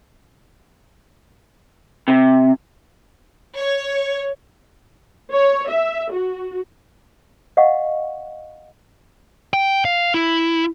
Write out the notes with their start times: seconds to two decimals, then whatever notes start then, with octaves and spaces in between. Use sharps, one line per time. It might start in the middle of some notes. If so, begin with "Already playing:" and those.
2.08 C3
3.57 C#5
5.33 C#5
5.69 E5
6.12 F#4
7.57 D#5 F5 F#5 C#6
9.53 G5
9.85 F5
10.14 E4